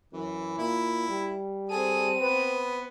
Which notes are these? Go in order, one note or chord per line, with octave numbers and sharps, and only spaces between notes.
F#2 E3
A#2 E4
G3
C4 G#4 A4 D#7
B3 B4